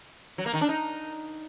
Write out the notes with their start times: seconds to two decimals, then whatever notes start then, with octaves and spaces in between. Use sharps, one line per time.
0.38 F#3
0.46 A#3
0.54 D#3
0.61 D4
0.69 D#4